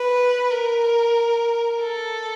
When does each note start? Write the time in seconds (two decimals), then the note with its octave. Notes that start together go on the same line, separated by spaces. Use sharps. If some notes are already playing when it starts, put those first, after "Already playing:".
Already playing: B4
0.50 A#4
1.80 A4